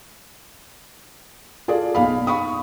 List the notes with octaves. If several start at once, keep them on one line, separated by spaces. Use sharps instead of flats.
F4 G#4 A4 D5
B1 D#4 F5 B5
B5 C#6 D#6